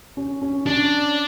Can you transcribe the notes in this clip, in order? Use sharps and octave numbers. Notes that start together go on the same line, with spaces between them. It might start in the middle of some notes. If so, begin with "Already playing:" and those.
C#4
C#4
C#4 D4